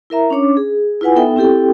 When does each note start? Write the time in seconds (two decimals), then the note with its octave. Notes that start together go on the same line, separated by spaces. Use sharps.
0.10 E4 A#4 E5 A#5
0.30 C#4 D4 C#5 D6
0.57 G#4
1.01 E4 F4 B4 F#5 G#5
1.15 B3 D#4 A4 E5 G5
1.36 C4 E4 G4 A4 G5